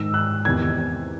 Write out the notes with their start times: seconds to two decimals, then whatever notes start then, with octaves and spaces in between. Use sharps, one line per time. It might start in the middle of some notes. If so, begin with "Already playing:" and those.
Already playing: G#2 D#3 E6
0.14 F#6
0.45 E2 C3 D#3 G#6